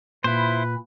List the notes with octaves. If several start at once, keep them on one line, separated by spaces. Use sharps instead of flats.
A#2 E4 B4 C5